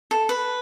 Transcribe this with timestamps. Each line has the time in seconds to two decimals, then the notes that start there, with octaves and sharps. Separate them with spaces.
0.11 A4
0.29 B4